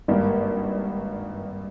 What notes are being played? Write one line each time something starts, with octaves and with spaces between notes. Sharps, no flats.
G#1 G2 G3 A#3